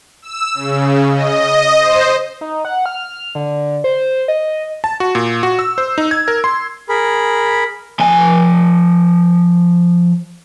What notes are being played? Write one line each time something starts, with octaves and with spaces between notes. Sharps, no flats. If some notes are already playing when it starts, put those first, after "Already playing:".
E6
C#3
D#5
C5
D#4
F#5
F6
D3
C5
D#5
A5
F#4
A#2
F#4
E6
C5
D#4
G#6
A#4
C6
G#4 A#4 B5
F3 G#5